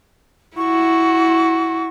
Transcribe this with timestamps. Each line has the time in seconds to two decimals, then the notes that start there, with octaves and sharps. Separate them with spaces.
0.57 E4 F#4 C#6